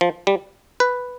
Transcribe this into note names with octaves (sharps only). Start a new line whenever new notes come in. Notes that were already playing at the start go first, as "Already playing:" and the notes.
F3
G3
B4